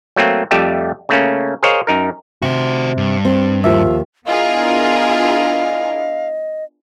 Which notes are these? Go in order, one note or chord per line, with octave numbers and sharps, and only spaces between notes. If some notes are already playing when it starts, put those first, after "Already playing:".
F#3 A3 A#3 C4
F2 G3 A3 G4 E5 A5
C#3 A3 A#3 C#4
G#4 A#4 C5 C#5 D#5 F5
F#2 D#4 A#4
C3 F#4 C5
G2
C4
D#2 F3 F4 E5
B3 D4 E4 F4 G#4 A#4 D#5 F5